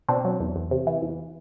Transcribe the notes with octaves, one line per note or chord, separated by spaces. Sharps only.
B2 C4 D4
F#3
E2
E2
C3
E3
E2